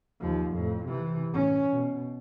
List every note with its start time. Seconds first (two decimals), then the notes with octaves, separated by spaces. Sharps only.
0.21 D#2 F3
0.53 F2 A2
0.86 C3 E3
1.32 A2 C#4
1.70 B2